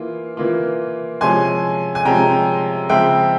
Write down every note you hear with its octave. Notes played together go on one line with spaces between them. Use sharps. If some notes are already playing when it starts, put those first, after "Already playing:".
Already playing: E3 A#3 F4
E3 A#3 F4
C3 F3 G#3 C#4 G#5 C6
G#5
C3 F3 G#3 C#4 G5 A#5
C#3 F3 G#3 C4 E5 G5